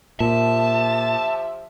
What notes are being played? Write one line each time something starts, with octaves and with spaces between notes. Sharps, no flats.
A#2 F3 G4 E5 A5